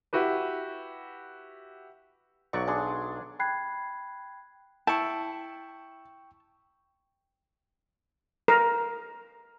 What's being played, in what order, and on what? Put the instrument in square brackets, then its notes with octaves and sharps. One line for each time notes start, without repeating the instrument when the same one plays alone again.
[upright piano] E4 F#4 G4 B4
[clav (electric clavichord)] B1 F#3 D5 [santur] C#6
[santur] D4 G#4 C6
[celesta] G5 B5 F#6 G#6 C7
[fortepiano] E4 [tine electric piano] G5 C#6 [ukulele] A5
[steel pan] A#4